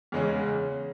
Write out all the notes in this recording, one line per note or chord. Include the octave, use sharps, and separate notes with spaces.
E2 C#3 G#3 C#4